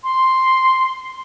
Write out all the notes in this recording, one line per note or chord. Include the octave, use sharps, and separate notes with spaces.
C6